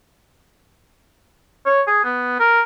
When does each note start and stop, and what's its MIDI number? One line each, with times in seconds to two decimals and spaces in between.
1.66 1.81 73
1.87 2.00 68
2.04 2.36 59
2.39 2.61 70